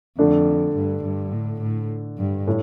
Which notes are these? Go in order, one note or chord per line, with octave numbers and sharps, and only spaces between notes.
F2 D3 A3 D4
G2
G2
A2
A2
G2
A2